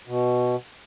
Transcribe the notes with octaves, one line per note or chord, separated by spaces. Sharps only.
B2